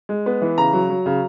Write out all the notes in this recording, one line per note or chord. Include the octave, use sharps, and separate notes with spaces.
G#3
B3
E3
C#3 A#5
F#3
F#3
C#3